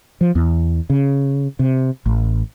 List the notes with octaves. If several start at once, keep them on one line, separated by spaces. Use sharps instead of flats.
F3
E2
C#3
C3
A1